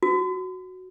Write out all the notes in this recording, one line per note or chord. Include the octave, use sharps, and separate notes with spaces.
F#4